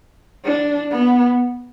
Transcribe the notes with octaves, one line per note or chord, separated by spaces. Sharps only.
D4
B3